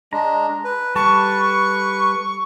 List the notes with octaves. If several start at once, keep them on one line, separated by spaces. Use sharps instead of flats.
G#3 D4 A#5
B4
G3 A4 B4 A5 C#6